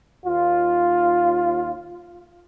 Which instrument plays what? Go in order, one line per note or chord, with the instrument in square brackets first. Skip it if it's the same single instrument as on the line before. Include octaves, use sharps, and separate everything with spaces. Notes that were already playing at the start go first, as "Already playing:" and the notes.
[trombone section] D#2 F4